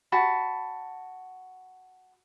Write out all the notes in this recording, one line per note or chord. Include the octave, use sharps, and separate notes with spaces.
F#4 A5 B5